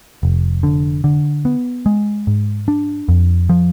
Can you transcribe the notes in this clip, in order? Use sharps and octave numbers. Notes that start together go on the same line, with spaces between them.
F1
D3
D3
B3
G#3
G#2
D4
F2
F3